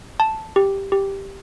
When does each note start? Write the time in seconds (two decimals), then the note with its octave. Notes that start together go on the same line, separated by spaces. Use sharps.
0.20 A5
0.56 G4
0.92 G4